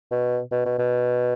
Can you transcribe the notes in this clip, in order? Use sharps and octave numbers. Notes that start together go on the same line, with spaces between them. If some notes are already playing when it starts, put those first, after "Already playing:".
B2
B2
B2
B2